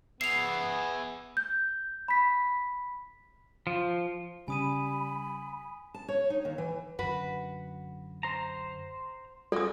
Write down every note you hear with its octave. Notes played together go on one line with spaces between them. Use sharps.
B3 G#4 E5 C7 F7
G6
B5 B6
F3
C#3 G3 C#4 G#5 B5 D#6 D#7
A5
C#5
D#4
D#2
E3
F#2 D3 F#4 B4
C5 A#5
F#3 G#3 A4 D#6